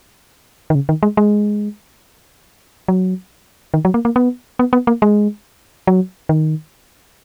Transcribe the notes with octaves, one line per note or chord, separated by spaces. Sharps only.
D#3
C#3
D#3
G#3
G#3
F#3
D#3
F#3
A#3
A#3
B3
B3
B3
A#3
G#3
F#3
D#3